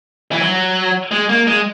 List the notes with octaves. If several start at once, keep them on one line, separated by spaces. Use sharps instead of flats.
E3
F#3
G#3
A#3
G#3